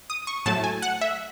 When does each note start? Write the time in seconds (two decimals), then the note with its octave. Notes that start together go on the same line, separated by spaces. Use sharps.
0.10 D#6
0.27 C#6
0.46 A2 F#3 A3 A5
0.64 G#5
0.82 F#5
1.01 E5